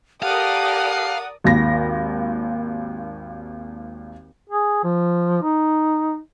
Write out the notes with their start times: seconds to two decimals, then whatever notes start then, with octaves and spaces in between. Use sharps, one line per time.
0.23 G4 A4 A#4 D5 F5 F#5 D#6
1.44 G#1 D#2 A#6
4.50 G#4
4.84 F3
5.42 D#4